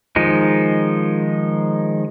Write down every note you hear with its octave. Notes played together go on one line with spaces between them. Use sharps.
D#3 F3 G#3 D#4